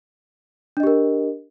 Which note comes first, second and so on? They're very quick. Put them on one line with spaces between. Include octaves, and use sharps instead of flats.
D4 D#5 G4 A#4